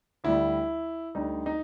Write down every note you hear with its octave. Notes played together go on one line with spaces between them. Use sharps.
D2 D3 G3 E4
D2 D3 G3 D#4
D#4